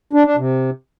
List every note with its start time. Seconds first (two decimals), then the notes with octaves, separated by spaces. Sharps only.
0.13 D4
0.25 D4
0.37 C3